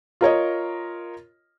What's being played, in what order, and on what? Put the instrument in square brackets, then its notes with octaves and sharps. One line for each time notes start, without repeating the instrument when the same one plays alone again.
[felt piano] F4 A#4 C#5 D#5